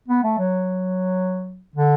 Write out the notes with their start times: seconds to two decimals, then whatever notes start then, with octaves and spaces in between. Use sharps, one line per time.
0.08 B3
0.23 A3
0.38 F#3
1.76 D3